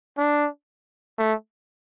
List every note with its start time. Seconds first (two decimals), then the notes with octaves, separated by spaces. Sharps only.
0.18 D4
1.19 A3